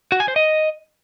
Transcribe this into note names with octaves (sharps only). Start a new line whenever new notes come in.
F#4
G#5
C5
D#5